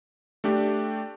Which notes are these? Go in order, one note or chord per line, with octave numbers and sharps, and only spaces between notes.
A3 D4 G4